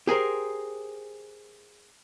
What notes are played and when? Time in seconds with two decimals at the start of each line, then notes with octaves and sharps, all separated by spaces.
0.07 G4 G#4 A#4 C5